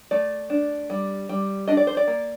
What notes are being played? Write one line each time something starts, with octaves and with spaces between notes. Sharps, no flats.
A3 D5
D4
G3
G3
D4 D#5
D5
C5
D5
A#3